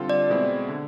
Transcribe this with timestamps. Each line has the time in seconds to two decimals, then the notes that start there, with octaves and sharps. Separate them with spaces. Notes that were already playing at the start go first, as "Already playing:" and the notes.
Already playing: D3 G3 C4 F4 A4
0.10 D5
0.29 B2 G#3 C4 E4
0.69 D3